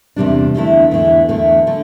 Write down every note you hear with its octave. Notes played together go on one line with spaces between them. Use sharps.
E2 C3 G3 D4
E2 D3 A3 E4
E2 D3 A3 E4
E2 D3 A3 E4
D3 A3